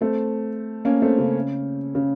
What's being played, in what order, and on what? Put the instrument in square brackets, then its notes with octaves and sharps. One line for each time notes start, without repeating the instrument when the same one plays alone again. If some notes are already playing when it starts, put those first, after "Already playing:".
[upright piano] A3 C4
A#3 C#4
A3 C4
C#3
C#3